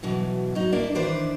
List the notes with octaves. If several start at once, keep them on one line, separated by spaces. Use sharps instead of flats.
B2 E3 F#3
F#3 D#4
A#3 D4 E4
D#3 E3 D4 B4 C5 D5